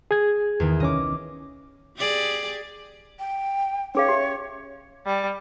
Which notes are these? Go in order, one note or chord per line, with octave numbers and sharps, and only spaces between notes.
G#4 G#6
E2 D#3
C2 C#4 D#5 D6
G4 G#4 D5
G5
C#4 G#4 C#5 F5
G4 E5
G3